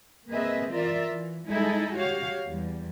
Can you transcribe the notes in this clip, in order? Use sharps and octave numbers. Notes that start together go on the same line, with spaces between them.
A#3 C4 G#4 B4 D#5 E5
E3 F4 A#4 D5 E5
E3
G3 G#3 D#4 E4 G#4 A4
F#4 G4 C#5 F5
E2 G3